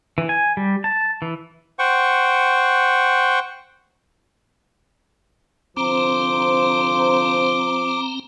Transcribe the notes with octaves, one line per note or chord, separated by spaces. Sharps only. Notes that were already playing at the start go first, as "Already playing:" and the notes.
E3
G#5
G3
A5
E3
C5 F#5 G5 C#6
C2 D3 F3 C4 C5 A#5 D6